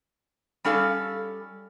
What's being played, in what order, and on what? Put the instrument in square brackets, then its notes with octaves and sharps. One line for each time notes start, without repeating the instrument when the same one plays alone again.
[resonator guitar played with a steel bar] G3 C#4 A4 F5